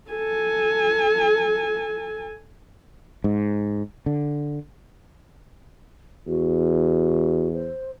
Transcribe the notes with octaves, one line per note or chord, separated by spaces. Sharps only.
A4 G#5
G#2
D3
E2 F#4
C5